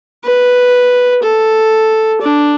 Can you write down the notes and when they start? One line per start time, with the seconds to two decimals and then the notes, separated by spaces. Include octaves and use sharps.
0.24 B4
1.23 A4
2.21 D4